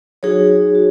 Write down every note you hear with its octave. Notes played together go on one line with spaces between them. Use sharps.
F#3 D#4 F#4 G#4 C#5
F#4